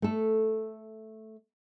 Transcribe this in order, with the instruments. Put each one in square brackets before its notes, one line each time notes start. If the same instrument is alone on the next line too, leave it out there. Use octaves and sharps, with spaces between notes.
[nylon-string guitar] A3 A4